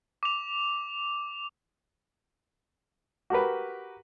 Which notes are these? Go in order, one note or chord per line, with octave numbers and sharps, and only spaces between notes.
D6 F7
F#4 G4 A#4 B4